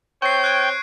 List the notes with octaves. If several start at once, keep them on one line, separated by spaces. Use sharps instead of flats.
C4 C#5 G5 C#6 C7
F#6 G#6 D7